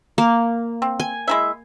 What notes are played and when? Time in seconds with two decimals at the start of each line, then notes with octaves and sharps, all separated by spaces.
0.18 A#3
0.82 C4
1.00 G#5
1.28 G#3 E4 E5